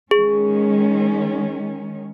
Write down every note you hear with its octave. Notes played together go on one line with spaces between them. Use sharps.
D#3 G#3 C#4 G#4